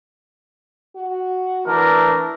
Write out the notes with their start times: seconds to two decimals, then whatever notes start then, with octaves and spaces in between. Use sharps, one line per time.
0.96 F#4
1.67 E3 A3 D4 A#4